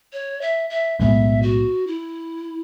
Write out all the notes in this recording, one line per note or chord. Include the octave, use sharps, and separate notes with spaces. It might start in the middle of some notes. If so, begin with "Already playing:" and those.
C#5
E5
E5
B1 A2 G#3 B3 E5
F#4
E4